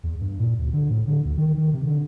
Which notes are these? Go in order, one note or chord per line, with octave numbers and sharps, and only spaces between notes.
E2
G2
A#2
D2
D3
A2
D3
D2
D#3
D#3
C3
D3